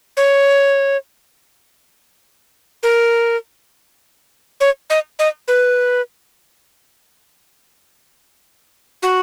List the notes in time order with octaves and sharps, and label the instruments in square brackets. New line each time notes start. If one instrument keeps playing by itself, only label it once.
[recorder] C#5
A#4
C#5
D#5
D#5
B4
F#4